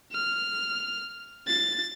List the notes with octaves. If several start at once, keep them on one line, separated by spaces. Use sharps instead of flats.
F6
A6